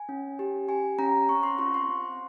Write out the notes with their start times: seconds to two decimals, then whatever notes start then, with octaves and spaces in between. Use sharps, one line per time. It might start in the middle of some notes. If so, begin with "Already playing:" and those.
Already playing: G#5
0.09 C#4
0.39 G4
0.68 G4 G#5
0.99 C#4 A#5
1.29 C4 C#6
1.43 C6
1.58 F4 C#6
1.74 C6
1.89 C4